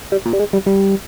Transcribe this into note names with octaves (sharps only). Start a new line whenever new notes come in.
G3
A#2
G3
G#3
G3
G3